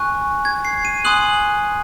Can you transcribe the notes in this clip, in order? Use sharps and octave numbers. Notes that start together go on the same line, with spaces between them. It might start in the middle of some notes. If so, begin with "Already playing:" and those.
Already playing: G#5 C#6 F#6
G#6
C7
D#7
G#5 C6 D#6 F#6 F#7